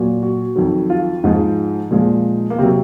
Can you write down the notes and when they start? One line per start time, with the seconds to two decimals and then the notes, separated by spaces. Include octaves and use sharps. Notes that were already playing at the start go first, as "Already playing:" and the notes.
Already playing: A#2 F#3
0.22 F#4
0.56 F2 D#3 F#3
0.90 F4
1.24 G#2 F3 G#3 D#4
1.91 A#2 F3 G#3
2.50 A#3
2.58 C3 F#3 C4